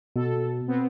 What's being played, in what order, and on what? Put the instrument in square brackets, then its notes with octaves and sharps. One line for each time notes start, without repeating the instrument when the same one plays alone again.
[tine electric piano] B2 [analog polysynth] A4
[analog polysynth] B3 C4